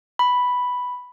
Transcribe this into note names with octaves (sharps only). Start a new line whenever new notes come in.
B5